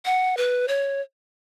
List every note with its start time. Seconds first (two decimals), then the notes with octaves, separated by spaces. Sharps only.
0.05 F#5
0.37 B4
0.68 C#5